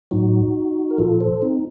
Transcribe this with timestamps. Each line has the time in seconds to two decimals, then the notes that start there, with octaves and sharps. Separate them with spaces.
0.11 A2 F#3 D#4 F#4
0.91 A#4
0.98 A#2 F3 F4 A4
1.20 A4 C5
1.42 C4 D#4